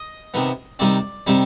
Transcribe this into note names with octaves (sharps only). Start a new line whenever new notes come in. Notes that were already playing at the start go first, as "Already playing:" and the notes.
Already playing: D#5
C3 D#3 B3
C3 D#3 G3 C4 D5
C3 D#3 G3 C4